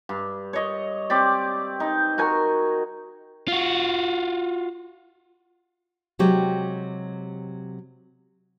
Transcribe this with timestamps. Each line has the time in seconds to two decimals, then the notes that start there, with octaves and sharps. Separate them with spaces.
0.09 G2
0.53 C#5 D#5
1.10 C4 G4 D5
1.80 D#4
2.18 F#4 A#4 G#5 C#6
3.48 F4 F#4
6.19 C3 F#3 G#3 G4